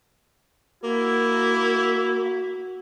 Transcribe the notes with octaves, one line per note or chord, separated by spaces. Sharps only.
A#3 E4 F#4